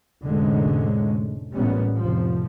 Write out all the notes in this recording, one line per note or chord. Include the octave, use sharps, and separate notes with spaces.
F1 A2 D3 G#3 C#4
A1 A#2 G3 B3 C#4
F1 C3 F3